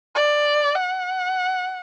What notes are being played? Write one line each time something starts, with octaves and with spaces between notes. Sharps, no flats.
D5
F#5